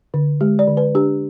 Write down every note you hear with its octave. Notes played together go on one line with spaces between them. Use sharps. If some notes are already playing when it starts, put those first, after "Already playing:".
D3
G#3 G4
D5
D3
B4
D4 G4